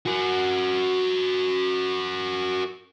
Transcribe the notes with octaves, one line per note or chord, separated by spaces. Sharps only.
F#4 A#4